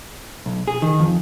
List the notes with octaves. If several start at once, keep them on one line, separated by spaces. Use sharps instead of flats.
B1
G#4
D#3
F2